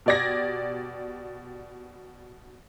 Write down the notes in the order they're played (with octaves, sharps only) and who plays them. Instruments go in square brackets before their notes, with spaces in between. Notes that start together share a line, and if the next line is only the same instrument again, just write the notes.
[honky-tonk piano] B2 G4 D5 G#6 A#6